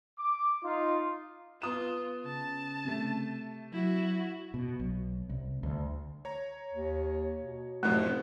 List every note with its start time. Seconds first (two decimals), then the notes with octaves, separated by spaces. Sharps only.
0.19 D6
0.64 D#4 F4
1.62 B3 F4 D#6 E7
2.26 C#3 A5
2.85 C3 A3
3.73 F#3 E4 F#4
4.54 B2
4.79 B1
5.29 C2
5.63 D2
6.25 C#5 A#5
6.73 D#2
7.38 B2
7.83 F1 F#2 A2 F3 A3